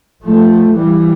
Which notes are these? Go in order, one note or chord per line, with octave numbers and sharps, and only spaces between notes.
F3 A3
E3 G3